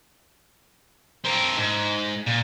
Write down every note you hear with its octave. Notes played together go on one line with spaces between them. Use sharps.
C4 A#4
G#2
A#2